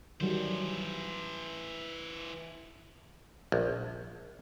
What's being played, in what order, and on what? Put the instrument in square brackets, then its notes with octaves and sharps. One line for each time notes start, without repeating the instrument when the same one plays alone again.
[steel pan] D#3 F#3 G3 [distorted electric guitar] E3 C5
[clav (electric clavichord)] A#1